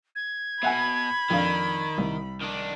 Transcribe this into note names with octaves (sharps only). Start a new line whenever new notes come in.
G#6
B2 E5 F#5 G#5 B5
F2 D#3 D4 F5
C2
D#3 D4